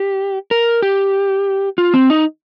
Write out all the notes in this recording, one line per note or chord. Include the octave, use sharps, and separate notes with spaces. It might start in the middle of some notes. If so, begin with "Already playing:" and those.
Already playing: G4
A#4
G4
F4
C4
D#4